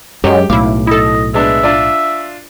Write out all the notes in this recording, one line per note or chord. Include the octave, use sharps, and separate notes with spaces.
F#2 F#3 G#3 G4
B1 A2 E4 F5 D6
E4 A4 D#5
G#3 B3 D4 E5
D4 F4 D5